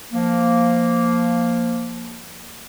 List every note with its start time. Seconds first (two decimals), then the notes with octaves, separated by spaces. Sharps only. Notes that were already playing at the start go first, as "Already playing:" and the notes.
0.13 F3 A#3